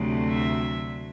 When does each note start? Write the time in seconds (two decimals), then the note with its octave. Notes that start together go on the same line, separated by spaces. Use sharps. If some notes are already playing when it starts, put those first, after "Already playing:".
Already playing: D2 C3 F#3 A3
0.30 E5